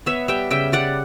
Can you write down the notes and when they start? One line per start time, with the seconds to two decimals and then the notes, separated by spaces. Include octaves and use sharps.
0.06 B3 C#5 E5
0.28 G3 E5 G5
0.51 C#3 E5 G5
0.72 G3 D5 F#5